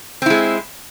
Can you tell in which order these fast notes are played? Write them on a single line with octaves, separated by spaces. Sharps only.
C4 E4 G#3